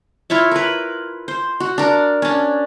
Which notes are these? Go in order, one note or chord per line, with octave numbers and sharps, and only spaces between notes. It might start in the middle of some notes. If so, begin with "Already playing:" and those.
E4 F4 C#5 E5
A#4 B4
C5
F#4
D4 A#4
C#4 D4